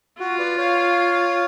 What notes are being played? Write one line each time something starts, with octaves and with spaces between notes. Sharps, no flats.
F4 F#4
B4 D5
C#5 F5